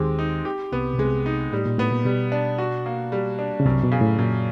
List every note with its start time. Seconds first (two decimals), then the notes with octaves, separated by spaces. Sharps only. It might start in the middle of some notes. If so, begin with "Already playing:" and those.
Already playing: D#2 D#3 G#3 C4 G4
0.19 D#4
0.45 G4
0.72 C2 C3 B3
0.93 B2
0.99 C2 C3 G#3
1.26 D#4
1.53 A2 G3
1.66 A#2
1.78 A2 B3
1.92 A#2
2.05 B2 G3
2.32 D4
2.58 F#4
2.86 A#3
3.12 G3
3.39 D4
3.60 C#3
3.65 C2 F#2 C3
3.83 B2
3.92 C#3
4.01 A2
4.18 F#2 A#2